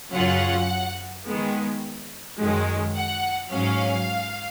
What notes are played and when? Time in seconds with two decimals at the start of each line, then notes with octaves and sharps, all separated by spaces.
0.13 F#2 C#3 F#3 C#4 F4 F#5
1.25 D#3 G#3 B3
2.38 F#2 D#3 G#3
2.94 F#5
3.50 G#2 F#3 C#4 F5